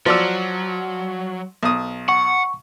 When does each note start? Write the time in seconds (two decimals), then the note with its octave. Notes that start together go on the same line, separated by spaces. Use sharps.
0.06 F3 F#3 D5 E6
1.63 B1 D#6
2.09 F#5 C#6